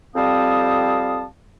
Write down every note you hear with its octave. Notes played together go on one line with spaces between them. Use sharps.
F2 G3 C4 F5 A5 D#6